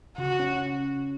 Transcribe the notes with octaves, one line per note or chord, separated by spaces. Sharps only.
C#3 F#4
C#4